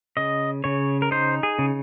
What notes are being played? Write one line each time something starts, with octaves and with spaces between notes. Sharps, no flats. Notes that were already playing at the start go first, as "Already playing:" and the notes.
C#3 D#5
C#3 C#5
A#4
D#4 C5
G#4
C#3